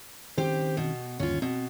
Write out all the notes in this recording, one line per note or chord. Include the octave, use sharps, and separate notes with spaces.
D#3 C4 C#4 G4 C5
B2
G1 D#2 C#4 F4
B2 C4